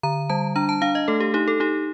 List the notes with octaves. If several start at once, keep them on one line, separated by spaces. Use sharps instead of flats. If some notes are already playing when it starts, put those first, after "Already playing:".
D3 A#5
G3 A5
D4 A#5
A5
D4 F5
D#5
A3 A4
G4
D#4 G4
A4
D#4 G4